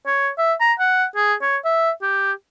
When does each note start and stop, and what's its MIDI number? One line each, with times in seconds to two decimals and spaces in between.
0.06 0.30 73
0.38 0.53 76
0.60 0.73 82
0.79 1.05 78
1.16 1.34 68
1.42 1.57 73
1.64 1.91 76
2.02 2.32 67